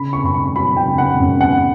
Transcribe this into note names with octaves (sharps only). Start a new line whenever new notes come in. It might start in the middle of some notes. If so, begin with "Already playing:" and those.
Already playing: C#3 B5
C#6
F#2 B5
C#6
F#3 B5
G5
C#3
F#5
F#2
F#5